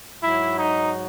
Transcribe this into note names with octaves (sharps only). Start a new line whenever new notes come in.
G#2 F#3 E4
D#4